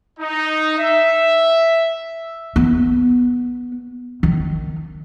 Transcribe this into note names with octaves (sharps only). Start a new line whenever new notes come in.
D#4
E5
B3
D#3